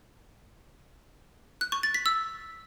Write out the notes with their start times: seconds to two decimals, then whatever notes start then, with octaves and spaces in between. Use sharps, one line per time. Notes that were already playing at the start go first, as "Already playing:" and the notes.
1.61 F#6
1.72 C#6
1.83 A6
1.94 B6
2.06 E6